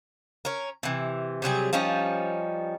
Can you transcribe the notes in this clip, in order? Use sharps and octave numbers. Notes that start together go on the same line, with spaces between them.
C#4 A#4
C3 E3
C3 F#3 G3 G#4
F3 G3 C#4 D#4